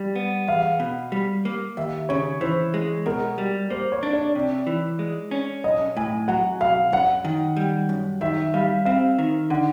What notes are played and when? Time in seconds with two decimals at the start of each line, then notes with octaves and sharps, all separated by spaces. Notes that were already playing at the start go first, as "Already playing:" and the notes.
Already playing: G3
0.16 B3
0.48 E2 F5
0.80 B2
1.12 G3
1.45 A#3
1.77 D#2 E5
2.09 C#3 C#5
2.41 E3 C5
2.74 G#3
3.06 B2 A#4
3.38 G3
3.70 A#3 C5
3.92 C#5
4.03 D4
4.13 D5
4.35 C3
4.67 E3
4.99 G#3
5.31 C#4
5.64 B1 D#5
5.97 A2 G#5
6.28 F#3 F#5
6.61 B1 F5
6.92 F#2 F#5
7.25 D#3
7.57 G3
7.89 F#2
8.21 D#3 E5
8.54 G3 F5
8.85 C4 F5
9.19 D#3
9.50 D3 F#5